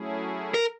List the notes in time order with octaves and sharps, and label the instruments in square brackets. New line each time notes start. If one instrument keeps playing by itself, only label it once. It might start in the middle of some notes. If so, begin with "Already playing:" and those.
Already playing: [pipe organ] F#3 A3 C#4 E4 G#4
[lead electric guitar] A#4